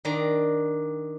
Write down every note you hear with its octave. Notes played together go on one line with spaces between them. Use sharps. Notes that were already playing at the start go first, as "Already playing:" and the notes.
D#3 D4 D5 D#5 A#5